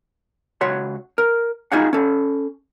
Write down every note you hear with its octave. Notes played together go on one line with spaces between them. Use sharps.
C#2 F#4 C#5 C6
A#4
D#4 F4 F#4 G#4 F5 F#5
C#4 A4